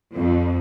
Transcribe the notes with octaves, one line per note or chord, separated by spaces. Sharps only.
F2